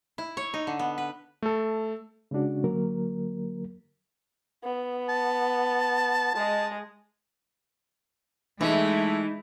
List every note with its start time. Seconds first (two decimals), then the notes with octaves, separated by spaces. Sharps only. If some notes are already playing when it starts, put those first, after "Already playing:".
0.18 E4
0.37 C#5
0.54 D#4
0.67 D3
0.79 B3
0.98 B4
1.42 A3 A4
2.31 C#3 G#3 C#4 D4 F#4
2.64 D3 F#3 A#3 A#4
4.64 B3
5.09 A5
6.35 G#3 D#5 A5
8.61 E3 G#3 A3 D#4 E4